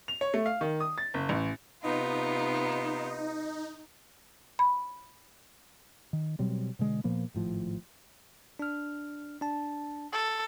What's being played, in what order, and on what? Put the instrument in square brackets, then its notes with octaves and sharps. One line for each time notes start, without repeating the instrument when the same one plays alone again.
[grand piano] F7
C#5
A3
F5
D#3
D#6
A6
F#1
A1
[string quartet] C3 B3 F4 [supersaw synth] D#4
[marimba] B5
[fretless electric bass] D#3
B2 F#3 G3 C4
B2 D3 G#3
A#2 F3 A#3 B3
G#1 A2 F3
[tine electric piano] D4 F6
D4 A5
[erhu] A4